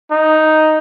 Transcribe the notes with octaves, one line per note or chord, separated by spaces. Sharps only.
D#4